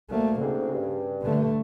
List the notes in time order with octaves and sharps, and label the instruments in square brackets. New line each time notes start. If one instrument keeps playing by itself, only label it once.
[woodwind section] D2 [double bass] A3 A#3
[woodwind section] D2 G#2 C4 [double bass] C#3
[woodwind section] G2
[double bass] D3 A3